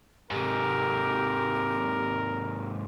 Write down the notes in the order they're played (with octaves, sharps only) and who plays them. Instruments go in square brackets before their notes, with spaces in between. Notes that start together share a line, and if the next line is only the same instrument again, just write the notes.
[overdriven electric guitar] G#2 C3 [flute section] G4 A4 [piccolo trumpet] A#4